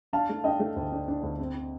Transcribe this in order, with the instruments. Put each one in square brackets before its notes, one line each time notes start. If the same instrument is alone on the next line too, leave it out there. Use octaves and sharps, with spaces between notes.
[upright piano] D4 F5 A5
A3
D4 D#5 G5
A3
D2
D4
D4
D2
C4
C4